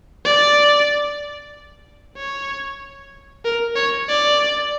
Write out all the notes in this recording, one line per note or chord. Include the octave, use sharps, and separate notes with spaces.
D5
C#5
A#4
C#5
D5